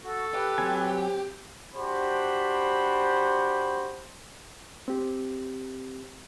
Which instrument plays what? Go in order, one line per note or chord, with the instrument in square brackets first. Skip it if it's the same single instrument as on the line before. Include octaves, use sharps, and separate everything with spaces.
[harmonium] F#4 [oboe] A4
[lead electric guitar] G4 [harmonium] B4
[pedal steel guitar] F#3 C4 G#5
[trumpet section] D4 F#4 G4 C5 B5
[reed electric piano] C4 G4